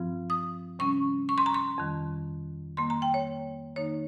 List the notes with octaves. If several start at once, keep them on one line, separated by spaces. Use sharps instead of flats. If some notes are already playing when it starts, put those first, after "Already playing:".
Already playing: G2 F3 C4 F4
D#6
C3 G3 C#4 C#6
C#6
C6
A#5
C6
F2 D#3 G3
D#3 G3 A#3 C6
A#5
G5
C#5
D#3 G3 A#3 D#4 C#5